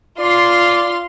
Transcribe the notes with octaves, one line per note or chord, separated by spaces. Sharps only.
F4 D5 C6